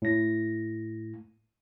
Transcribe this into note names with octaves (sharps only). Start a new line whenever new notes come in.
A2 A#6